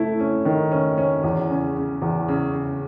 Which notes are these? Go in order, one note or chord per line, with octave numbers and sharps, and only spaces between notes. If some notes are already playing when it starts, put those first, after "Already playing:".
Already playing: A3 E4
C#4
D#3
C#4
C#4
E2
C#3
C#3
E2
C#3
C#3